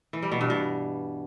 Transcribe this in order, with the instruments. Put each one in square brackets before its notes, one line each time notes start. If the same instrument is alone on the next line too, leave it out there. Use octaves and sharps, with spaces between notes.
[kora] E3
G3
B2
G2
B2